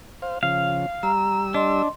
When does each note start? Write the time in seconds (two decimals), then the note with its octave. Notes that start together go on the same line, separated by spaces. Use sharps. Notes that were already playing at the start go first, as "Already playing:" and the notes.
0.22 C5 F5
0.43 C#3 F3 F5
1.03 G3 A#5 E6
1.54 D4 D#5 C6